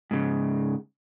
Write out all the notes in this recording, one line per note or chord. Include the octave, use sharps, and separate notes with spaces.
G#2 C#3